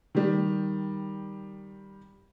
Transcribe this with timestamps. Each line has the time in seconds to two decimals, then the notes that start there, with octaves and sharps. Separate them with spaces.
0.15 D#3 G3